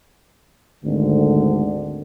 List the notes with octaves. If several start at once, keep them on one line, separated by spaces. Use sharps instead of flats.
G#1 D2 D3